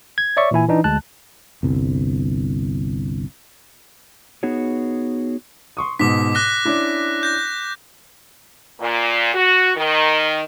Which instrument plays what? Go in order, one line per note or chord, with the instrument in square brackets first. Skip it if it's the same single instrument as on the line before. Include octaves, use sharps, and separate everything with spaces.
[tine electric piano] G#6
C#5 D5 E5 C#6
A#2 E3 E4 G#5
E3 D4 D#4
D2 G#3 A5 F#6
[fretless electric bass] G1 C2
[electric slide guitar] B3 D#4 F#4 G#4 C#5
[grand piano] C6 C#6 D#6
[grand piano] G#2 B2 [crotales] D6 B6
[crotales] D6 F#6 A#6 [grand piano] G7
[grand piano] C#4 D4 E4
[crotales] G6 A#6
[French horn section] A#2
F#4
D#3